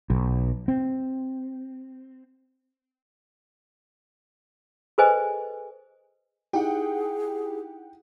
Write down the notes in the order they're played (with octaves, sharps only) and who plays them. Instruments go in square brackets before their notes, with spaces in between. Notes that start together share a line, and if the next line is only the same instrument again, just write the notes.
[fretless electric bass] B1
C4
[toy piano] G#4 A4 B4 C5 D#5 G#5
[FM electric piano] D#4 E4 G4 [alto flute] G#4 [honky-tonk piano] F#5 G5